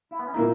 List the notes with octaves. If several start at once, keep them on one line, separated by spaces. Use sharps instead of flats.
E4
B3
C#4
A#2 A#3 D#4 E4